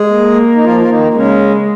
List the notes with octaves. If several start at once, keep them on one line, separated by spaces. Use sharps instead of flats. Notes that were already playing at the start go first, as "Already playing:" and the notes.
Already playing: G#3 G#4
A#3
D#4
F3 F4
F4
D#3 D#4
C#3 G#3 C#4